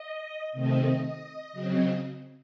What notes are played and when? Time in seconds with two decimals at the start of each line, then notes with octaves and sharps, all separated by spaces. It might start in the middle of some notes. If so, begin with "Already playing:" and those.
Already playing: D#5
0.53 C3 D#3 A3 C4 D#5
1.02 D#5
1.53 C#3 F#3 C4